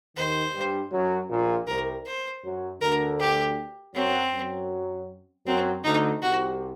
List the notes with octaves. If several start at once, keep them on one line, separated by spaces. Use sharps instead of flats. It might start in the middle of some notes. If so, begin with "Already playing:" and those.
D#2 D#3 C5
G2 G3
F#2 F#3
A#1 A#2
C2 C3 A#4
C5
F#2 F#3
D2 D3 A#4
G4
F#2 F#3 C4
F#2 F#3
F#2 F#3 C4
D2 D3 D#4
C2 C3 F#4